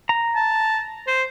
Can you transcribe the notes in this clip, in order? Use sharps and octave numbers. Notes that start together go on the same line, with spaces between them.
A#5
A5
C5